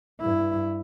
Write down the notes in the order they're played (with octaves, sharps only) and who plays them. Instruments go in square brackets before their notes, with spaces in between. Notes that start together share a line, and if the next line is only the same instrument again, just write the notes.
[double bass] G2 E4